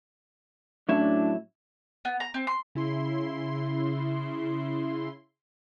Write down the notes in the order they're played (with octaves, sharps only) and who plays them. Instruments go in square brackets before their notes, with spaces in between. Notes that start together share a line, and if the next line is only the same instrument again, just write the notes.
[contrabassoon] A2 [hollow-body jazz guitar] F#3 C#4 E4 [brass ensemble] D4
[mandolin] B3
A#5
C4
C6
[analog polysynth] C#3 E4 C6